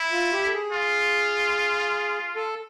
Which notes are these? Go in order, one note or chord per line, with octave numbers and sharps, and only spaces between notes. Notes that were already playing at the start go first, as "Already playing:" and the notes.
Already playing: E4
F4
G4
A4
G#4
F4
A4